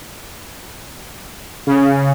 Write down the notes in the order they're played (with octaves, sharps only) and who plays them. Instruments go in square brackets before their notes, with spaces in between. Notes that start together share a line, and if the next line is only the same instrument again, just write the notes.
[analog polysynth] C#3